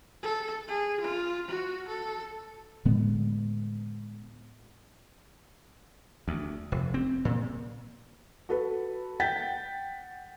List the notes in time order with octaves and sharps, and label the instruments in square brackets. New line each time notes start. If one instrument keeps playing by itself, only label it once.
[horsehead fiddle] A4
G#4
F4
F#4
A4
[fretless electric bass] A2 D3 G#3 B3
[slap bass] D2
F1
C4
A#2
[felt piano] F#4 A4 B4
F#5 G5 G6 A6 B6